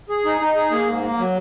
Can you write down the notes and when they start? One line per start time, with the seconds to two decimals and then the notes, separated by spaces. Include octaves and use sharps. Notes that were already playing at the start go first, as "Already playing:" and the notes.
0.09 G#4
0.25 D#4
0.41 D#4
0.56 G#4
0.71 A#3
0.88 G#2
1.03 A#3
1.18 F#3